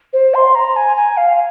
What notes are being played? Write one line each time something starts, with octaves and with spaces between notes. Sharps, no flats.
C5
C6
A#5
G#5
G#5
F5